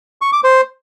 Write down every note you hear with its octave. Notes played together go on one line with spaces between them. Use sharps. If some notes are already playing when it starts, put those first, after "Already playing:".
C#6
D6
C5